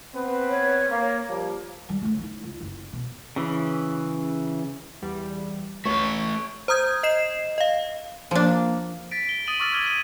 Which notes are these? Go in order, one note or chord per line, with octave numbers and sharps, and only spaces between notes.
B3 C4 B4
C#5
A#3
F3 G3 A#3
D#3 G3
D3 A3
C#4 D#4
C#2
F#1
B2
C#3 E3
E2 G3
C#2 A3 B4 C#5
C5 A#5 D#6 G6 G#6
D#5 C7 E7
D#5 F5
F3 A#3 D4
A6 B6 D7
D7 G7
D#6 A6 D#7 F#7 G7
C#6 D6 E6 F6 A6 D#7
C#6 F6 G#6 A6 G7
D#6 G#6 D#7